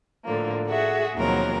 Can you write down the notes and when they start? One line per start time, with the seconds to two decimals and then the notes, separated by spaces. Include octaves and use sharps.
0.24 A2 D3 F3 A#3
0.67 F#4 G#4 E5 F#5
1.15 D#2 B2 F3 F#3 C4 A#4